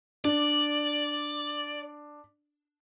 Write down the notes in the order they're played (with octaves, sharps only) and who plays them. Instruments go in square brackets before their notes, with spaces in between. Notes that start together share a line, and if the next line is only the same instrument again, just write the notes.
[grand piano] D4 [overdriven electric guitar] D5